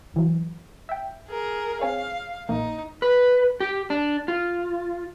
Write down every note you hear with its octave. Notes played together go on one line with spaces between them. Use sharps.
A1 E3 F#3
E5 G5
G#4 A#4
C4 G#4 C#5 F5
A#1 A#3 D#4
B4
G4
D4
F4